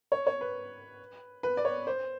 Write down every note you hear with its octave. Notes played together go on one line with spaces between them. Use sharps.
C#5
C#5
B4
B4
D5
C#5
C5